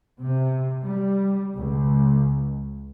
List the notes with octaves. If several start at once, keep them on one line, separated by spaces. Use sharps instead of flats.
C3
G3
C#2